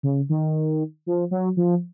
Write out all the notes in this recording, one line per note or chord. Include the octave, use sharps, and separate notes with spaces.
C#3
D#3
F3
F#3
F3